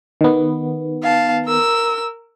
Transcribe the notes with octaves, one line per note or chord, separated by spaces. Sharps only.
D#3 B3
F5 A5
A#4 E6